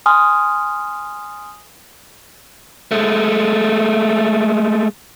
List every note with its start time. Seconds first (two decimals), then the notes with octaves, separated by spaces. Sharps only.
0.06 G#5 C6 D#6 F6
2.92 G#3 A3